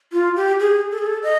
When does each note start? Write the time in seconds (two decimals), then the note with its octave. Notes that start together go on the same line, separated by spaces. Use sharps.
0.12 F4
0.36 G4
0.60 G#4
0.91 A4
0.99 G#4
1.06 A4
1.23 D#5